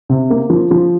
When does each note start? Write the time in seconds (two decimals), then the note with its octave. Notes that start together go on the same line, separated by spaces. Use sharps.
0.09 C3
0.30 A#3
0.50 F3
0.71 F3